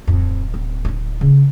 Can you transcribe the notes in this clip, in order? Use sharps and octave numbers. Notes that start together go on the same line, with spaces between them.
D1 F2
C4
D#4 E4
C#3